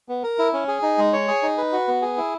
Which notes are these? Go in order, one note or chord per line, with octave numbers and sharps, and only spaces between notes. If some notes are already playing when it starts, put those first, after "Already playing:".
B3
A#4
E4
C#4
G#4
D#4
G#3
C#5
G#4
D#4
B4
F#4
B3
G#4
E4